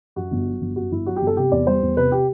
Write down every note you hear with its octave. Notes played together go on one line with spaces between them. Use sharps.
F#2 F#4
G1
F#3
G1
F#2 F#4
G1 E4
F#3 F#4
G4
G1
A4
C3 G4
E2 D5
G3 C5
E2
C3 B4
G4